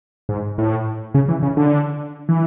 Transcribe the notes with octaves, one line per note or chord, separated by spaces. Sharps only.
G#2
A2
C#3
E3
C#3
D3
E3